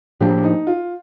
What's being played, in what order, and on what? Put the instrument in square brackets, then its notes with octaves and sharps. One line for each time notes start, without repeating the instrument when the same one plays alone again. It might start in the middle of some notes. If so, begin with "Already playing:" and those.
[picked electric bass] A2 F3 A#3 D4 [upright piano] G4
[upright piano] D#4
F4